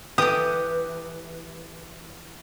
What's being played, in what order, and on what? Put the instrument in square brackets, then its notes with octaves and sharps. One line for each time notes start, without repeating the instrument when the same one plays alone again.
[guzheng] E3 [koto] G4 [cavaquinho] A4 D#6